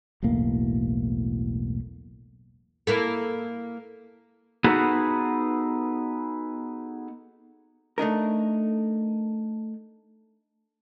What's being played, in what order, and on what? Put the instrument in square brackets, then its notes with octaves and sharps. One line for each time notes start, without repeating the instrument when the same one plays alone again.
[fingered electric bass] E1 B1 A2 A#3
[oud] A#3 E4 A4
[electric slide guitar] B3 D#4 F#4 G#4 A4 B4
[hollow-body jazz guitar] A3 D4 D#4 A#4